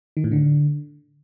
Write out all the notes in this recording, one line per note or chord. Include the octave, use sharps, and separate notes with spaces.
D#3
A2
D3